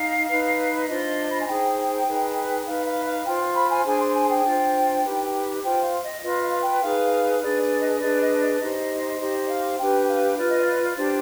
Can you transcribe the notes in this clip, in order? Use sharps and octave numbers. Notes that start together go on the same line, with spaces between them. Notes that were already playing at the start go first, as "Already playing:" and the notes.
Already playing: D#4 F5
D#4 B4
D4 F4 C5 D#5
B5
G#5
D#4 G#4 C5 G5
D#4 G#4 B4
D#4 B4 F5
F5
F5
F4 C5 G5
B5
G#5
D4 G#4 C5 G#5
C6
G#5
G5
D4 F4 C5
D#4 G4 B4
F4 C5 G5
F5
D#5
F4 B4 D#5
F5
G5
D#4 G#4 B4 F5
D4 G#4 B4 D5
D5
D#5
D4 G#4 B4 D5
D#5
D5
D#4 G4 C5 D#5
D#4 G4 C5 D#5
F5
D4 G4 B4 G5
F5
F4 B4 D5
D#5
D5
D4 G4 C5